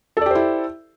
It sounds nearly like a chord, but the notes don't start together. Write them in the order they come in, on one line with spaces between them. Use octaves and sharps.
A4 D5 G4 C5 E4